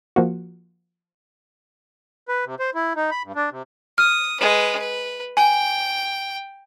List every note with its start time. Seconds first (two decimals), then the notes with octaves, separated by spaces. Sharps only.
0.16 F3 A#3 F#4
2.29 B4
2.45 C3
2.59 C5
2.75 E4
2.96 D#4
3.11 B5
3.23 G2
3.36 D4
3.51 C3
3.98 D#6 F6
4.40 G#3 B4
4.79 B4
5.37 G5 G#5